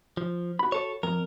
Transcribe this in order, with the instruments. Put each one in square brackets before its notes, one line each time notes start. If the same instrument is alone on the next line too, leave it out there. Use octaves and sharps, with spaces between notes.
[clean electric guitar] F3
[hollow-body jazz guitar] F#4 B5
[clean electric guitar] A4 C#5
[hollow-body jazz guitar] F2 [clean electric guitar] A#4